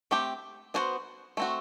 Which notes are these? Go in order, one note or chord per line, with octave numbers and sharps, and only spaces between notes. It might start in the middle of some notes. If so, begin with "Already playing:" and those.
A3 C4 G4
B3 D4 F#4 C5
A3 C4 F#4